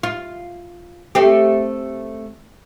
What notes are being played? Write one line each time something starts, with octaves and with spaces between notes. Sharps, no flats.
F4
A3 C4 G4